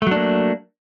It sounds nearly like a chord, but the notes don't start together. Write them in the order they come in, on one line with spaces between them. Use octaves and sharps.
A3 F#3 D4 A#3